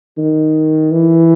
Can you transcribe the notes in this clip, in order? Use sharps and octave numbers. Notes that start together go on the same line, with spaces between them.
D#3
E3